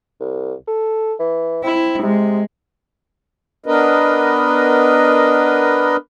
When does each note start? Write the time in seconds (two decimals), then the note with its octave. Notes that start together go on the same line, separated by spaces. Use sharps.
0.20 C2
0.68 A4
1.19 E3
1.64 C4 E4
2.03 C3 G#3
3.66 B3 D4 A#4 B4 D#5